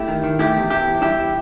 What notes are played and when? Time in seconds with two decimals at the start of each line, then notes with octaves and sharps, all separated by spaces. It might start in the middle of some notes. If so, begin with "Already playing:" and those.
Already playing: A3 E4 G4
0.08 D#3
0.24 D#3
0.39 A3 E4 G4
0.56 E2
0.70 E2 E4 G4
0.86 E2
1.02 G2 E4 G4